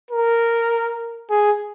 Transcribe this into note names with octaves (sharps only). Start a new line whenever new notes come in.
A#4
G#4